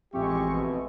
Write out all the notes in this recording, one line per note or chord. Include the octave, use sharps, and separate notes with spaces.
A1 F2 G#3 C4 G4 E5 C#6
B2